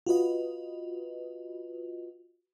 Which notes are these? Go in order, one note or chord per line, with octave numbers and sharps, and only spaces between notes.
F4 F#4 B4 D#5